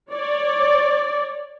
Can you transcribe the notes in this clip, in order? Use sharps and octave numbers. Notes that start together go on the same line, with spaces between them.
C#5 D5